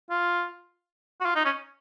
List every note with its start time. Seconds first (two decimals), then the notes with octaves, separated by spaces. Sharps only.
0.10 F4
1.21 F#4
1.26 F4
1.36 D#4
1.45 C#4